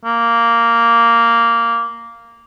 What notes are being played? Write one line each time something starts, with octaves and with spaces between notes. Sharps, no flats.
A#3